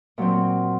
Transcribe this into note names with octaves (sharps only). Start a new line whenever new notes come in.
A#2 F#3 C4